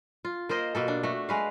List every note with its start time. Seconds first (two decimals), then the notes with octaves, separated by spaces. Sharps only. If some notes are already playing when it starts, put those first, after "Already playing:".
0.25 F4
0.49 A#3 A#4 C5 D#5
0.75 B2 A#3 A4
0.88 D4
1.03 A3 F#4
1.29 G#3 B4 F5